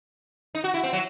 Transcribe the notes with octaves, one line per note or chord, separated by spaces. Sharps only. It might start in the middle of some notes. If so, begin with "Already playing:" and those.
D#4
F#4
E4
C4
F#3